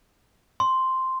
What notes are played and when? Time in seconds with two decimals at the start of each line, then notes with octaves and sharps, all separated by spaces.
0.60 C6